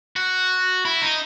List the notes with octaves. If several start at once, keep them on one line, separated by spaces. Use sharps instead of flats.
F#4
E4
D#4